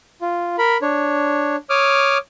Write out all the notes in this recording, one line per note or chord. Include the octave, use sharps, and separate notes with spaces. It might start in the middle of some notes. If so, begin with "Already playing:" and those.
F4
A#4 B5
D4 C#5
C#5 D6 D#6 F6